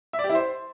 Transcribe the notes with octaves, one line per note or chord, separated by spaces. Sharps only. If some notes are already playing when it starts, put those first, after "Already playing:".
E5
D5
G4
E4
C5